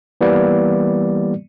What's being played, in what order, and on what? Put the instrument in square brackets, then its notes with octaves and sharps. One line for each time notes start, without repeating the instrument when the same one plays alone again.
[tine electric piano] E3 G3 A#3 B3 D5